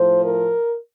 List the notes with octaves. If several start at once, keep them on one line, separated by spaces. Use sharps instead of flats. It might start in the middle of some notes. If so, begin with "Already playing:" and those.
Already playing: A2 F3 C5
A#4